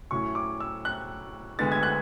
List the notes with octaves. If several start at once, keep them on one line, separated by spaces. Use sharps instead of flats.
A2 F#3 C#4 E4 C#6
D6
E6
F#6
D2 D3 G#3 B3 A6
G#6
F#6